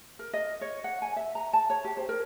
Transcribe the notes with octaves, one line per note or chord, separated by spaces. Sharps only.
A#4
D#5
C#5
F#5
G#5
E5
A#5
A5
C#5
G4
C5
A#4